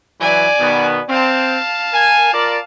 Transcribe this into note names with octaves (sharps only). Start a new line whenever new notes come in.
E3 F#3 B4 D5 G#5
B2 D#3 B3
C4 F5 A5
A#4 G#5
F4 A#4 D5